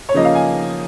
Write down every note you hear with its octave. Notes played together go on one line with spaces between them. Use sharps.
C#5
C#3 F3 A#3 C#4 D#5
F5
G#5